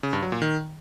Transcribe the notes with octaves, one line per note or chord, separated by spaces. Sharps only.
C#3
G2
F#3
A#2
D#3